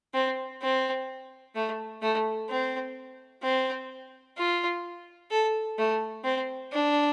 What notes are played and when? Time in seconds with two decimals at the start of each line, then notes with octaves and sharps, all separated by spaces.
0.14 C4
0.62 C4
1.55 A3
2.02 A3
2.49 C4
3.43 C4
4.37 F4
5.31 A4
5.78 A3
6.24 C4
6.72 D4